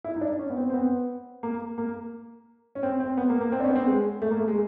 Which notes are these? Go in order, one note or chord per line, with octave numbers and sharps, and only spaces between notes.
E4
D#4
D4
C#4
B3
C4
C4
B3
A#3
A#3
C#4
C4
C4
B3
A#3
A#3
C4
D4
C#4
B3
C4
G#3
A3
A#3
A3
G#3